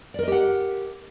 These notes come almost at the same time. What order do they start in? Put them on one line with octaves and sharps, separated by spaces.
D5 A#4 D#5 G4 F#5